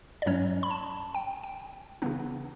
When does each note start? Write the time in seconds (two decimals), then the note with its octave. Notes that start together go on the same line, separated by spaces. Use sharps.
0.22 D5
0.26 G2 F#3 C#4 C#5
0.63 B5
0.70 A5
1.15 G5
1.43 G5
2.02 C#3 E3 B3 D4